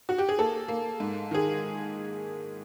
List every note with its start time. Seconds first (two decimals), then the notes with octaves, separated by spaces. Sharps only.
0.09 F#4
0.18 G4
0.29 G#4
0.38 A#3 A4
0.68 A#3
1.00 G#2
1.31 D#3 G#4